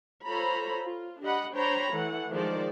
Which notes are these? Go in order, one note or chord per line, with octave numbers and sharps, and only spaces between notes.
F4 A4 C5 C#5 A#5 B5
F4
D4 G4 D#5 F#5 B5
D4 C5 C#5 G5 A#5 B5
E3 A3 F#5
D#3 F3 G#3 C5 D5